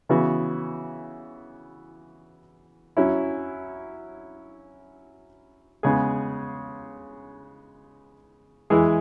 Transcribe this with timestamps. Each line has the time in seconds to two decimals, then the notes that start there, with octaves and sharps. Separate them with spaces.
0.09 C#3 E3 B3 F#4
2.97 F#3 C#4 E4
5.83 C#3 G#3 B3 G#4
8.70 E3 G#3 E4 G#4